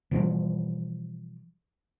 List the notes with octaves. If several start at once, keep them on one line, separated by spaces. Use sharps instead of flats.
B2 E3 F3 G3